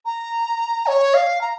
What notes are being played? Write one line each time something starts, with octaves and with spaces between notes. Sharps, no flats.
A#5
C#5
F5
A#5